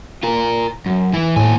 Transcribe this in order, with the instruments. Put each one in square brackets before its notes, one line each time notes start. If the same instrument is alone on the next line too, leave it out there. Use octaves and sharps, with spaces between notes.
[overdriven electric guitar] F4 A#4
F#2
E3 E4
[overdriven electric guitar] D#2 G#5 [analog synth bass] A2